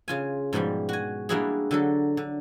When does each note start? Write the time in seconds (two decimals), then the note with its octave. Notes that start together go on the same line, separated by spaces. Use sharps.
0.08 C#3 F4 G#5
0.53 G#2 B2 F3 G3
0.89 F#4 G#5
1.29 G3 A#3 D4 E4 F#4 G#4
1.71 D3 F#3 A4
2.17 D3